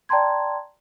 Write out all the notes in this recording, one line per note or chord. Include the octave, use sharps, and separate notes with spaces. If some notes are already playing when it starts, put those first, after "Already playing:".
D5 G5 A5 A#5 C6 G#6